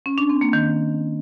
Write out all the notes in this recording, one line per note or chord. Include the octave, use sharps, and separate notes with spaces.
C#4
D4
C4
A#3
D#3